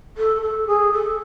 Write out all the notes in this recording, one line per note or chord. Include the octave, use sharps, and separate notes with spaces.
A4
A4
G#4
A4